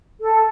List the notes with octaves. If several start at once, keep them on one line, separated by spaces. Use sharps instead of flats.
A4